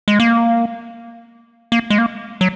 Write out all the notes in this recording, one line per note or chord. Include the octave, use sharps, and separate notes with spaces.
G#3
A#3
A#3
G#3
A#3
F#3